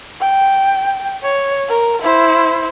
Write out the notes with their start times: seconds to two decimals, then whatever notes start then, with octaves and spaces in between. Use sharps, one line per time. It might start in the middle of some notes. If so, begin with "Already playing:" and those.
0.21 G5
1.22 C#5
1.69 A#4
2.02 E4 C5